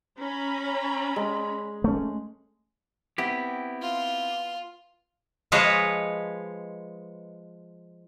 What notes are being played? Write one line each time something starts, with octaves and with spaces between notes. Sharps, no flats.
C#4 A#5 B5
G#3
A3 C#4
B3 C4 E4 G4
F4
F3 G#3 B4 C#5 D#5